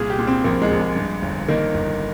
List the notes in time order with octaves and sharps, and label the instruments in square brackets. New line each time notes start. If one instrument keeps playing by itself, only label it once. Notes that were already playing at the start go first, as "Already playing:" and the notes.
Already playing: [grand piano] C2 A#2 G#4
G4
A#2
C4
A#1 A#3
G#3
A#1
G#3
G2
G1
D#3 A#3
G1